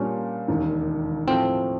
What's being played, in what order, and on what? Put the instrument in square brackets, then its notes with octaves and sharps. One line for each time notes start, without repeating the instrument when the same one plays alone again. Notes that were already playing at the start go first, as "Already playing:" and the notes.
Already playing: [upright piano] A#2 G3 A#3 D4 [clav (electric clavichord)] C#4
[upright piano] E1 D#2 D#3
[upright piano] A2 F3 A3 [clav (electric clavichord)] C4